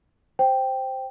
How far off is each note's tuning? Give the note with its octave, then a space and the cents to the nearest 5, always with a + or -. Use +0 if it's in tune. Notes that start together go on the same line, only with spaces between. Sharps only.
C5 +0 G5 +0